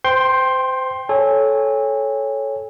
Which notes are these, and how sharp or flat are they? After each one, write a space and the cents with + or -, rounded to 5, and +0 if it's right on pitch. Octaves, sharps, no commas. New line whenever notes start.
C5 -25 G5 +0 C6 +15
A4 -20 C#5 +0 G#5 -35